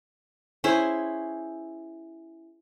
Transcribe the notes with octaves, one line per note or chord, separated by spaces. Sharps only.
C#4 E4 G#4 C5